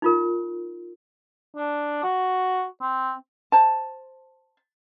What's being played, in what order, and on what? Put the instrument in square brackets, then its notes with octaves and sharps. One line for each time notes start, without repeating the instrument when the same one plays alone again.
[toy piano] D#4 F4 A#4
[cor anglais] D4
F#4
C4
[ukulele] C5 A5